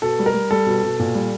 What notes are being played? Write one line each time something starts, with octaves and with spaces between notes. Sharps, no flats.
B2 A4
G3
A#4
G3
G3 A4
B2
B2
A#2
G3